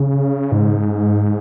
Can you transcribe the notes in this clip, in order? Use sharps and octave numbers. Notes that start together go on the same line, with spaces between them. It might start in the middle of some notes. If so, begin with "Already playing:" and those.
Already playing: C#3
G#2